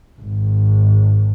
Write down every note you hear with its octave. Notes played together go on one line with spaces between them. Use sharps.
G#1